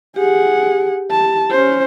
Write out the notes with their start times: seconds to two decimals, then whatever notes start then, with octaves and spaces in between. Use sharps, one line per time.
0.16 G4 G#4 F#5
1.11 A5
1.50 C#4 C5